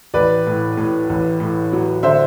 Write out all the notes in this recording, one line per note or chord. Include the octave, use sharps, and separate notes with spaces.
A1 B4 D5
A2
A2
A1
A2
F#3
D3 C5 E5